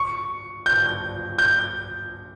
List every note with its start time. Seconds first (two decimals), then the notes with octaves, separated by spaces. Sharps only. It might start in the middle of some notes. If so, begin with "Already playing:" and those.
Already playing: C#6
0.66 G6
1.38 G6